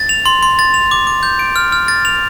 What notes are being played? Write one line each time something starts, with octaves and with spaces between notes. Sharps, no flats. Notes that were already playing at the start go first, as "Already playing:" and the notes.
Already playing: A6
F7
C6
C6
A6
F7
D6
D6
G6
D7
F6
F6
A6
F7